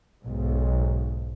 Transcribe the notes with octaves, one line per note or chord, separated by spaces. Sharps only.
B1 G#2